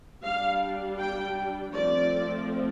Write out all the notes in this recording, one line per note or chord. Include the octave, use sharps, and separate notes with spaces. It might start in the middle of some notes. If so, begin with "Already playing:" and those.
G3 D4 F5
G5
F3 A3 C4 D5